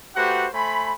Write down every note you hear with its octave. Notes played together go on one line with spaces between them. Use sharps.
A3 F#4 G4 B4 C5 F#5
A3 C5 G#5 B5